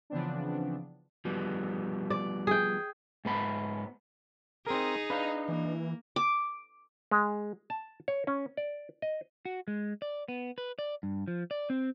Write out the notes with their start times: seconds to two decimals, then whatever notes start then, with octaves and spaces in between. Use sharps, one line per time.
0.10 C#3 E3 F3 B3 C4 D4
1.25 F3 G3 B3
2.10 D5
2.47 G#4 G5
3.25 G#2 B3 B5
4.67 C4 D#4 G#4 A#4
5.10 D4 B4 D#5 F5 A#5
5.48 E3 A#3
6.16 D6
7.11 G#3
7.70 A5
8.08 C#5
8.27 C#4
8.57 D5
9.02 D#5
9.45 F#4
9.68 G#3
10.02 D5
10.28 B3
10.58 B4
10.79 D5
11.03 G2
11.28 F3
11.51 D5
11.70 C4